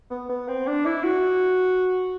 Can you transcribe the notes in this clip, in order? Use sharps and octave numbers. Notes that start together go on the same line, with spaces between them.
B3
B3
C4
D4
E4
F#4